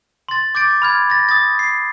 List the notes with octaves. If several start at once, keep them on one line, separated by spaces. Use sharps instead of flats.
C6 A6
D6 G6 A6 D7
B5 F6 G#6
A6 A#6
D#6 A6
C7